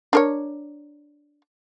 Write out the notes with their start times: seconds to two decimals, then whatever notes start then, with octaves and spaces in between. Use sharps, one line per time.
0.13 D4 A#4 C#5